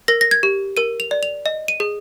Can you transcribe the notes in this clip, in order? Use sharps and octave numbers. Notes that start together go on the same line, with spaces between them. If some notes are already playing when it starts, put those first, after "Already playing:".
A#4 A#6
A#6
G#6
G4
A#4 D#7
F7
D5
F7
D#5
D#7
G#4